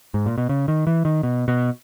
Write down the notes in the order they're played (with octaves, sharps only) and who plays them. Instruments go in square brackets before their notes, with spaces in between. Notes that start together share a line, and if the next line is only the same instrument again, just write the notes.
[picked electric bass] G#2
A#2
B2
C#3
D#3
E3
D#3
B2
B2